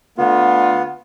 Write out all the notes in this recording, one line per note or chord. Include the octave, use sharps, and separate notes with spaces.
D3 A3 B3 F4